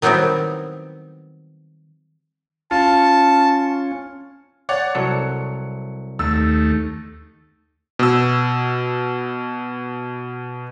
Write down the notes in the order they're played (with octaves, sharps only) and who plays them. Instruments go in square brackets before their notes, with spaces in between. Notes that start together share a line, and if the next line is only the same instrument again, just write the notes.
[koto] D#3 F#3 G3 B3 C4 E4
[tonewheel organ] C#4 [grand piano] F4 [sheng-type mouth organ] A5
[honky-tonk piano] C#5 D5 F#5
[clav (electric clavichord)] C2 F#3 A4 [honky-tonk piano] C#7
[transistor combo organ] D#2 A3 [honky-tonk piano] E6
[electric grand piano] B2 E6